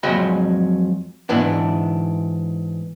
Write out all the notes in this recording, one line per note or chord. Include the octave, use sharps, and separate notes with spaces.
F2 F#3 G#3 D#5 G5 B5
G#2 E3 B3 D4